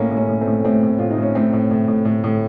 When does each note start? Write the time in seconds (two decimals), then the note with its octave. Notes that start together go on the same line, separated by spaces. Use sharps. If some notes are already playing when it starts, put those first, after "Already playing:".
Already playing: A2 A#3 C#4
0.11 A2
0.17 A#3 C#4
0.29 A2
0.41 A3 C4
0.47 A2
0.64 A2 A3 C4
0.83 A2
0.99 A2 F4
1.11 D#4
1.18 A2 C#4
1.35 A2 A3 C4
1.53 A2
1.71 A2
1.88 A2
2.05 A2
2.24 A2